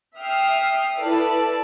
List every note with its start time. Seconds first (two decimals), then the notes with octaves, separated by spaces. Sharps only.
0.18 E5 G5 D#6 F6 C7
0.98 E4 A4 B4 D5 A5